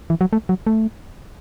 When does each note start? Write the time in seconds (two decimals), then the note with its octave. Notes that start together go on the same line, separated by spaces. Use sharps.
0.10 E3
0.21 F#3
0.33 A3
0.49 F#3
0.67 A3